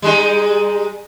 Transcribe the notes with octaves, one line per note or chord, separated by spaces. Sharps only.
G3 G#3 D#4